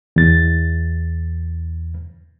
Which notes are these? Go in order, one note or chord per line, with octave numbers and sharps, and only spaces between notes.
E2 A6